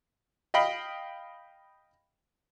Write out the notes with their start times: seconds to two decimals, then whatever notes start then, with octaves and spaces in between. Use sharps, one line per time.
0.54 D#5 F5 G5 B5